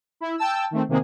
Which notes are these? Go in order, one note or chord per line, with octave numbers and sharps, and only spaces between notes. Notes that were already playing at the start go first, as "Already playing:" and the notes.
E4
G5 A5 E6
D#3 A3 C4
C3 D#3 G#3 A#3 C4 G#4